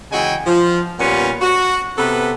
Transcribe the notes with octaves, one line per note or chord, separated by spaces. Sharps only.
C#3 E3 G#3 F#4 G5 G#5
F3
A#2 G3 B3 C#4 F4 B4
F#4
C3 B3 A4 B4